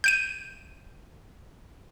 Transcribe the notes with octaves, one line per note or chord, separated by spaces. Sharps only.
G6 D7 D#7